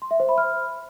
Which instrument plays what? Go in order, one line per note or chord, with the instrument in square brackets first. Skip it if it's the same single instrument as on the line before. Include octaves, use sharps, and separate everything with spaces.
[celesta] C6
E5
C5
B5
F6